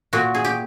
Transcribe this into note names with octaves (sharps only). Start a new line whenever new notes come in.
A#2 F#4
G#4
G4